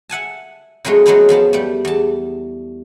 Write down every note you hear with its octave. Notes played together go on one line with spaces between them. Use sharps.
E5 F#5 G#5 A5
F2 F#3 G#3 A3 C#4
F#3 G#3 A3 B3 D#4 E4
E2 F3 B3 A5
G3 A3
E2 A5